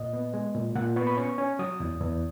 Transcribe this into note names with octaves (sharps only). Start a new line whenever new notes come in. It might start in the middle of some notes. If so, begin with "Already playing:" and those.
Already playing: A#2 D#5
B3
G#3
A#2
A#2 F#5
B3 C#6
B5
C#4 C#6
C#4
F#3 D#6
E2
E2